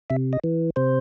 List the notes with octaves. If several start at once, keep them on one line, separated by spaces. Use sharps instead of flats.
C3 E5
D#5
E3
C3 C5